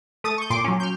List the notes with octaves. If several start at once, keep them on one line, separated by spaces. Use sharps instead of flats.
A3 D#6 A6
C#6 G6
A#2 C6 D6
F#3 C#4
F6 G6